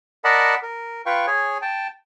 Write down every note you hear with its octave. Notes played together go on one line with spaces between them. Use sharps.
A#4 D5 D#5 F#5 A5 B5
A#4
F4 B4 F5 G5 C#6
G#4 C#5 G#5
G5 A5